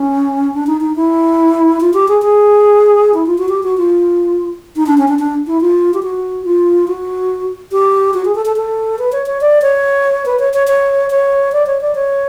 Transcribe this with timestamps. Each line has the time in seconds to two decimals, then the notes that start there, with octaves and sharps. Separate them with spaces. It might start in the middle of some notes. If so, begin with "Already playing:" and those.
Already playing: C#4
0.54 D4
0.67 D#4
0.81 D#4
0.96 E4
1.80 F4
1.94 G4
2.08 G#4
2.22 G#4
3.14 E4
3.26 F4
3.38 F#4
3.49 G4
3.63 F#4
3.78 F4
4.76 D#4
4.86 D4
4.98 C#4
5.08 D4
5.19 D4
5.47 E4
5.61 F4
5.94 G4
6.03 F#4
6.45 F4
6.88 F#4
7.72 G4
8.14 F#4
8.25 G#4
8.35 A4
8.46 A4
8.56 A4
8.99 B4
9.12 C#5
9.26 C#5
9.41 D5
9.62 C#5
10.26 B4
10.39 C#5
10.54 C#5
10.67 C#5
11.10 C#5
11.52 D5
11.67 C#5
11.81 D5
11.95 C#5